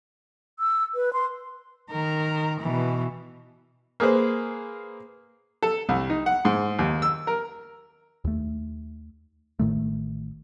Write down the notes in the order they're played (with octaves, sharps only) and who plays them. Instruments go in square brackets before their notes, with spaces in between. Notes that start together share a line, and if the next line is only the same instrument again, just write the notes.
[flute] E6
B4
C6
[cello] D#3 A#4
B2 E3
[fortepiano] A#3 G#4 B4 C5
A4
C2
D#4
F#5
G#2
D#2
E6
A#4
[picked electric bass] D#2 A3
A1 A2 D#3 A3